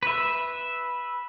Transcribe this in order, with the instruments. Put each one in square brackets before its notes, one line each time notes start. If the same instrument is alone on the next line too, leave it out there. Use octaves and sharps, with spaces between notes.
[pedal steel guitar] B4 E5